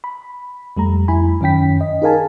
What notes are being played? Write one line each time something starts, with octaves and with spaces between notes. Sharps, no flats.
B5
F2 G3 A3 A#5
F2 E4 G#5 B5
F#2 D#3 C#4 G5 B6
D#5
D#4 G#4 A#4 F5 G#5 A5